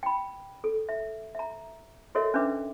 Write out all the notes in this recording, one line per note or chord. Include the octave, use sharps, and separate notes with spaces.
G5 B5
A4
E5
E5 A#5
F#4 A4 A#4 C#5 D#5 E5
C#4 D4 B4 E5 D6